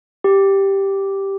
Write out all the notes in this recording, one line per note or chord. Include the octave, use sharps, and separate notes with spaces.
G4